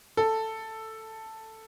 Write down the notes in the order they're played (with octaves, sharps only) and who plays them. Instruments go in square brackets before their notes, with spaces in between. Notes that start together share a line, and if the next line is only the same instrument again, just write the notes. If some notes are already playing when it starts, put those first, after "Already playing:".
[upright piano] A4